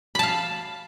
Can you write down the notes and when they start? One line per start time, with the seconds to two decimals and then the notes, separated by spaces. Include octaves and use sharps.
0.15 B5
0.19 A5
0.23 F5